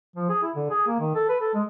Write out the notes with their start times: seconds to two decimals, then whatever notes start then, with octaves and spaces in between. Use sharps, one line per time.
0.16 F3
0.29 G#4
0.43 E4
0.56 D3
0.70 G#4
0.87 A#3
1.00 D#3
1.15 A4
1.29 B4
1.40 A4
1.54 G#3